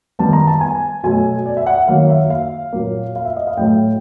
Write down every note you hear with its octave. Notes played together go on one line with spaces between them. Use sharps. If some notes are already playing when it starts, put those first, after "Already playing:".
D#3 G3 B3 A5
A#5
A5
G#5
B2 F#3 A3 G#5
D5
E5
F#5
D#3 F#3 A#3 F5
E5
F5
A#2 F#3 A#3
F5
E5
D#5
F5
A2 F#3 A3 G5